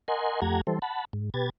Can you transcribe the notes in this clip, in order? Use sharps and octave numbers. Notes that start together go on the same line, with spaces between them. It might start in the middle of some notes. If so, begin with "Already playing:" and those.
A#4 D#5 F#5 G#5 C6
F2 A3 G4 F#5 A#5 G#6
E3 G3 A4 C5
F#5 A5 B5
G#2
B2 G4 B4 G#6 A6